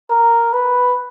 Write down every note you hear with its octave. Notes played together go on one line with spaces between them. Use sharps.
A#4
B4